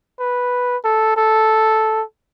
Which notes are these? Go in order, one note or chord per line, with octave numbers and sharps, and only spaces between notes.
B4
A4
A4